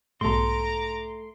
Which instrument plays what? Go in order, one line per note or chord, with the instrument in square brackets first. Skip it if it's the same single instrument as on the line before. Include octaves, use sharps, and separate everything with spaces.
[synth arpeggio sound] B1 G#2 [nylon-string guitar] A3 A4 [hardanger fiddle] A#5 D6 [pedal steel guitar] C6